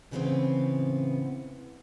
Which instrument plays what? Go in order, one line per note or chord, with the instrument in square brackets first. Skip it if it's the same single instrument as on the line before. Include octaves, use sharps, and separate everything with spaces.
[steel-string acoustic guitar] A2 C#3 E3 G#3 B3 C4